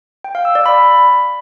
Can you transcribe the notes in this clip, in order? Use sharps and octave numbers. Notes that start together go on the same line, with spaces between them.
G5
F5
E6
D5
B5